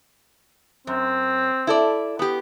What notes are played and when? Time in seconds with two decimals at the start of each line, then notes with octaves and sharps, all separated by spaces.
0.87 F#2 C4
1.67 E4 A4 D5
2.19 B3 G4